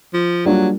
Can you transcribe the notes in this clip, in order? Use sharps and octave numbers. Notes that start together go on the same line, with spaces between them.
F3
F#3 G3 A#3 D4 F4